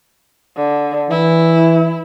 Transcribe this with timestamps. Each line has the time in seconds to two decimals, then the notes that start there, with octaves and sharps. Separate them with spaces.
0.57 D3
1.11 E3 E4